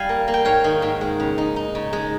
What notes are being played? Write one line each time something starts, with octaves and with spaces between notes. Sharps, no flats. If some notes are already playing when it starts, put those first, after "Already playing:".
Already playing: G3 F5 G#5
A#3
A#3
G5
G#2 C#5 F5
D#3
G#2
G#3
C#3
D#4
D#4
C#3
G#3